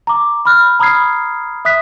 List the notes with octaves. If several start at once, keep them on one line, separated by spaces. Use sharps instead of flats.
A#5 D6
B5 F6 F#6
A#5 B5 D#6 F6 G#6 C7
E5 D#6 F#6 B6